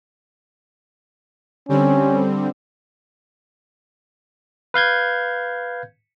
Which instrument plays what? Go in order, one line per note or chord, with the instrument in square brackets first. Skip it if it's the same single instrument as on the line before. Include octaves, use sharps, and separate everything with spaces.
[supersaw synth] D3 G3 C4 [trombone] C#4
[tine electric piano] B4 F5 G6 G#6